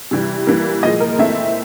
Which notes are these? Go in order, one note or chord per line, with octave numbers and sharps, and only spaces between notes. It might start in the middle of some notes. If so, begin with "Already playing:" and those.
C3 E3 G3
E3 G3 A#3
A#2 F3 G#3 D#5
A#4
E3 A3 C4 E5